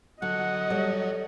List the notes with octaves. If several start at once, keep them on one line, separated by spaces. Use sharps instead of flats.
D3 F#3 D#5 F#5
G3 A4 C#5